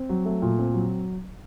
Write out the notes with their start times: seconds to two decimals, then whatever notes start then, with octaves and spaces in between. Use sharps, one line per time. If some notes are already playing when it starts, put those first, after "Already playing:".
Already playing: C4
0.09 F#3
0.25 A3
0.42 A#2
0.59 C4
0.74 F#3